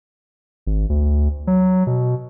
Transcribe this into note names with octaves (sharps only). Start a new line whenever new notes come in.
G#1
D2
F#3
B2